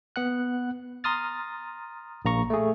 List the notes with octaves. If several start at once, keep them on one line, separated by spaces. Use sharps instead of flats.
B3 F#5 F#6
A#5 C6 D#6 F6 A6
A#1 A#3 A#5 C#6
A3 G#4